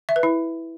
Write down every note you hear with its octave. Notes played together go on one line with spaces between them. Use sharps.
E5
B4
E4